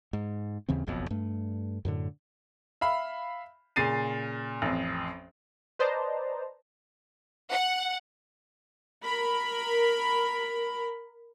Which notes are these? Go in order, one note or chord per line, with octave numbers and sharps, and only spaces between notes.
G#2
D#2 C#3 E3 C4
F#1 B1 F2 B2
G2 A3
F#2 A2 D3
E5 F5 B5
A#2 C#3 A6 C7 D#7
A1 F2
B4 C5 D5 D#5 A5 A#5
F#5
A#4 B5